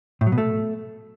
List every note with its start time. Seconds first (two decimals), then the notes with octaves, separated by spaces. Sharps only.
0.21 A2
0.27 F#3
0.32 B2
0.38 A3